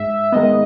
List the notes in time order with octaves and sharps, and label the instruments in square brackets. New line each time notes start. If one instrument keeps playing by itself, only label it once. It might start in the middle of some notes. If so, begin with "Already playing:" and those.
Already playing: [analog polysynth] G#2 [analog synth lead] E5
[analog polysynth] D#3 G#3 B3 [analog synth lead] D#5